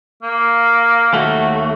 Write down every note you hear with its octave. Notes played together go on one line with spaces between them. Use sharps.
A#3
D#2 A3 F#4